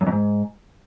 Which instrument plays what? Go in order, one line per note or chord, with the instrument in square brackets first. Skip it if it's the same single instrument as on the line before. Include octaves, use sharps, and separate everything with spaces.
[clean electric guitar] F#2
F2
G#2